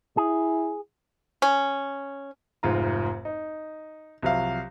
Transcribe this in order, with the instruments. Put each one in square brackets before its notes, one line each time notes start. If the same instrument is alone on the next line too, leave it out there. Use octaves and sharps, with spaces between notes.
[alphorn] E4 [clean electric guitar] G#4
[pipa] C#4
[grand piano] F1 G#2 F4 A#5
D#4
C2 F3 F#3 E5 F5